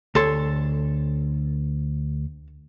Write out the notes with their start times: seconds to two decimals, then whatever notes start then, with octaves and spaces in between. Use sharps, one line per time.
0.15 D2 A4 C#5 C6